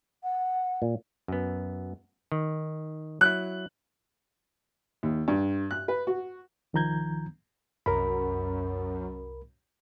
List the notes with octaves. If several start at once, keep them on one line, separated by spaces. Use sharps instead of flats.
F#5
A#2
F#2 B3
D#3
F#3 E4 F#6
D#2
G2
F#6
B4
F#4
C2 D#3 F3 A#5 G6 G#6
C2 F#2 A#4 B5